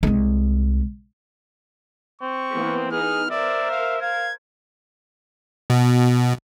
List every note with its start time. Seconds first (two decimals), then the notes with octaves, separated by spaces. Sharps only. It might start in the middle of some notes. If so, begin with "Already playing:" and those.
0.03 C2 G#3
2.21 C4 C#6
2.53 E3 A#3 B3
2.92 B3 D#4 G#4 F6
3.30 A#4 C5 D5 E5
3.71 F5
4.02 F5 G#6
5.70 B2